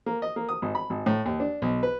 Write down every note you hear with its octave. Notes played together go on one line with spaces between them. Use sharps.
A#3
D#5
A#3
D#6
G#1
B5
G#1
A2
D#2
D4
B1
B4